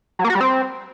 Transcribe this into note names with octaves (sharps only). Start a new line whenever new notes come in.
F#3
A#3
F#4
G3
C4